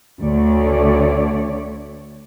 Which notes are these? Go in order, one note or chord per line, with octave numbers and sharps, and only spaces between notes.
D2 D3 A3 C#5 D5